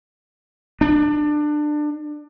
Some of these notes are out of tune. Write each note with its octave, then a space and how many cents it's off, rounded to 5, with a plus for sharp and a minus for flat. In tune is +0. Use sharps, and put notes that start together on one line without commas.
D4 +25